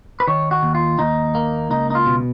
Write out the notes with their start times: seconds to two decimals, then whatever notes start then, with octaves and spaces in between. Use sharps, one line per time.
0.20 B4
0.28 D#3 C#5
0.51 F#4
0.63 D#2
0.75 F4
0.99 D#2 D#4
1.35 A#3
1.71 C#2 D#4
1.90 D#4
1.95 F4
2.06 B2